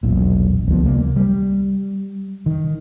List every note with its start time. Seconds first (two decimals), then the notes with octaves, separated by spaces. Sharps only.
0.03 E1 B1 A#2
0.68 D2 F3 B3
0.83 C2 A#3
1.16 G3
2.46 D#3